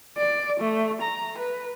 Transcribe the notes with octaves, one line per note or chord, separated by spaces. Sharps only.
D5
A3
A#5
B4